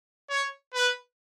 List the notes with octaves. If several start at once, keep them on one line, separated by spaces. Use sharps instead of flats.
C#5
B4